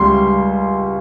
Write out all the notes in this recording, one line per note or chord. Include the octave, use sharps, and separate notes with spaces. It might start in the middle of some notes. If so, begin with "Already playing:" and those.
Already playing: C#2 G3 C6